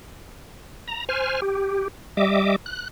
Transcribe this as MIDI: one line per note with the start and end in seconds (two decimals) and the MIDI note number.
0.88 1.05 82
1.09 1.40 72
1.09 1.40 80
1.09 1.40 89
1.42 1.88 67
2.17 2.56 55
2.17 2.56 75
2.17 2.56 76
2.17 2.56 86
2.66 2.88 90